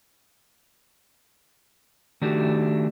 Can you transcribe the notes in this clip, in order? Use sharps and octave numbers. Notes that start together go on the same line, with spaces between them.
D#3 A3 D4 F#4 G4